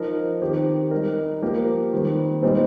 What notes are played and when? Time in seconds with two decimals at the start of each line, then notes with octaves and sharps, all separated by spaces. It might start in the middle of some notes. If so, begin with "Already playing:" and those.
Already playing: F3 D#4 A#4
0.42 D#3 C4 G4
0.91 G3 D#4 A#4
1.42 F3 A#3 G4 A#4
1.92 D#3 G3 C4
2.42 A#2 G3 C4 D#4